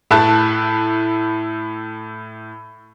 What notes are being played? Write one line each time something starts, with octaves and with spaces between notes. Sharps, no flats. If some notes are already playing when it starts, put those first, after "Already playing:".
A2 E4 A5 F#6